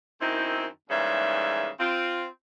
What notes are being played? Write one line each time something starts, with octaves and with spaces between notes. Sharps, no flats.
F#2 D#3 C4 D#4 E4
D#2 G#2 C#3 E3 G3 E5
C4 F4